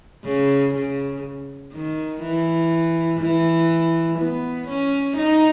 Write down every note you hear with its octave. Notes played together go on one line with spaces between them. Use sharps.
C#3
C#3
D#3
E3
E3
B3
C#4
D#4